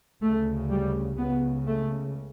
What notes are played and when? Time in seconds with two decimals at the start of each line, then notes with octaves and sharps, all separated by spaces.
0.21 D2 C#3 A3
0.70 G3
1.18 C#2 C#3 B3
1.67 A3